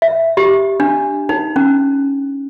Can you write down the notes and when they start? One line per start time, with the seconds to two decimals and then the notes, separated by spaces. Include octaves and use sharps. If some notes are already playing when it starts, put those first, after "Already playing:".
0.02 E5
0.37 G4
0.80 D4
1.29 D#4
1.56 C#4